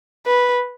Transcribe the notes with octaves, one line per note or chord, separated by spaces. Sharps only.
B4